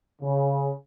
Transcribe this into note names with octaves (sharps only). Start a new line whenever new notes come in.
C#3